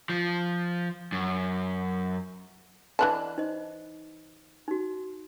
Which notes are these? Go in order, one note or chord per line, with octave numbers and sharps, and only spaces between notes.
F3
F#2
E3 D4 B4 D#5 A5
D#4 C5 D#5
D#4 F#4